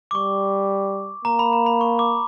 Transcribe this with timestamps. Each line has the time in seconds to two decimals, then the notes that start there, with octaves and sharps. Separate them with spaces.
0.11 D6
0.15 G3 C#6
1.25 A#3 A#5
1.39 B5
1.53 A#5
1.66 B5
1.81 C#6
1.99 D6